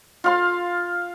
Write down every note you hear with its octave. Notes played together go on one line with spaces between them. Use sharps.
F4 F5 C6